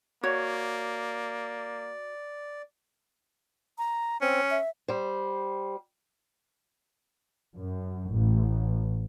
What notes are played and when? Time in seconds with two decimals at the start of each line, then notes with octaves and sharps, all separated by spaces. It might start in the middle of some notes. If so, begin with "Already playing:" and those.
0.23 A#3 F#4 C#5 D5
3.78 A#5
4.21 C4 C#4
4.50 E5
4.88 G3 C5
7.56 F#2
8.12 A1